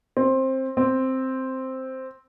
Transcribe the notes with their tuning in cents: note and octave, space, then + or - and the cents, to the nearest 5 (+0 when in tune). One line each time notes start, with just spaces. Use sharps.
C4 +15
C4 +0